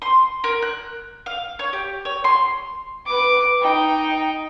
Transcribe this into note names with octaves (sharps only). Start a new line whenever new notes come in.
C6
A#4
F#6
F5
C#5
G4
C#5
C6
B4 D6
D#4 G5